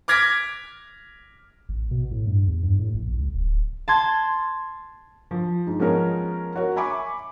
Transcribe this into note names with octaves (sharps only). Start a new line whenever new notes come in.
D6 F6 G#6 A#6 B6 D7
A1
B2
A2
G2
E2
G2
A2
A#1
C#2
D1
A5 C6 G#6
F3
G#2
F3 G#3 B3 C#4 A#4 C#5
F#4 A#4 C#5
E5 G#5 B5 C#6 D6